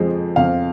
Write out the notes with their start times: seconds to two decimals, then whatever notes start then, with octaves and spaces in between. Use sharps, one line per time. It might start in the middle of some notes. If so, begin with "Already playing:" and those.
Already playing: F2 F3 G#3
0.36 F2 F5